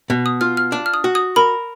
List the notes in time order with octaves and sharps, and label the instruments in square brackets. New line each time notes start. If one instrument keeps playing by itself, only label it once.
[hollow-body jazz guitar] B2
[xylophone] D#6
[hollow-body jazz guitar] F4 [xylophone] F6
[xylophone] F6
[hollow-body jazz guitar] D4
[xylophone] F6
D#6
[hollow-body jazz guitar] F#4
[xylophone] D#6
[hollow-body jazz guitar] A#4 [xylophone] B5